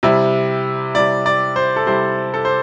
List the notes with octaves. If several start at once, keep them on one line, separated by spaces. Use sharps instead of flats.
C3 G3 E4
C3 G3 E4 D5
D5
C5
A4
C3 G3 E4 C5
A4
C5